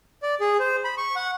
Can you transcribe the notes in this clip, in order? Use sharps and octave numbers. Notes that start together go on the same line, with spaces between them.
D5
G#4
C5
B5
C#6
F#5